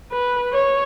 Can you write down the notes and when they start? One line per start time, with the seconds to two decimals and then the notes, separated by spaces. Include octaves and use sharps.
0.12 B4
0.53 C#5